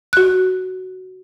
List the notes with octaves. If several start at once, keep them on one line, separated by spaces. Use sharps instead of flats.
F#4 F#6